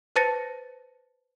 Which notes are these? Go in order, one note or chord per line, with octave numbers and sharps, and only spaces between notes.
B4 C5 A5 A6 A#6 C#7